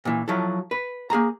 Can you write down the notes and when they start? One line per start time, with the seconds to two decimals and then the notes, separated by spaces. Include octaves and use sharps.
0.05 A#2 E3
0.28 F3 F#3 E4 A4
0.71 B4
1.10 A#3 G#4 G#5 A#5